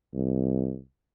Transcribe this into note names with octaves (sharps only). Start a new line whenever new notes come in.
C2